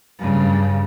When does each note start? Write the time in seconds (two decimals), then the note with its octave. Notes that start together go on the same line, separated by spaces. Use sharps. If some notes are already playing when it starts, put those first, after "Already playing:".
0.19 G2 C#3